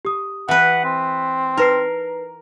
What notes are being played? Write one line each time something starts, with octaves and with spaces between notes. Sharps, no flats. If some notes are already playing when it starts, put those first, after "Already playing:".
G4 D#6
E3 B4 F#5
C4
D#4 A#4 B4 C7